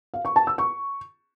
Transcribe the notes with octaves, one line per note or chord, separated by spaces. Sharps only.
F5
C#6
A5
E6
C#6